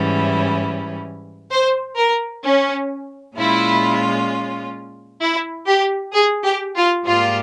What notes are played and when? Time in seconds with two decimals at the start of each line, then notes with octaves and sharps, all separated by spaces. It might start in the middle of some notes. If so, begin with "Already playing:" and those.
Already playing: G#2 E3 G3 C#4 E4
1.51 C5
1.97 A#4
2.44 C#4
3.36 A#2 G#3 C#4 E4 F4
5.21 E4
5.67 G4
6.14 G#4
6.44 G4
6.76 F4
7.06 G#2 G3 A#3 F4